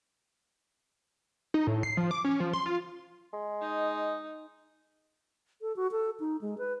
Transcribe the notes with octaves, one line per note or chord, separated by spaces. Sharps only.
D#4
A2
C7
F3
D6
C#4
F3
C6
F4
G#3
D#4
A4
F#4
A4
D#4
G#3
B4